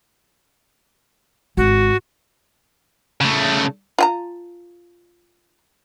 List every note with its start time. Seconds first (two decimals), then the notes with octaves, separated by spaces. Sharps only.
1.57 G#1 F#4
3.21 C#3 A3
3.99 F4 G5 A#5